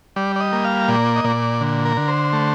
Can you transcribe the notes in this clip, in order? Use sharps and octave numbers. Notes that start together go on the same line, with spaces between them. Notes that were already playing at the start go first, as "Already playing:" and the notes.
G3 D5
D5
D#5
A#3
F5
A#2 D5
D#5
A#2 D5
D3
A#4
D3
C5
A3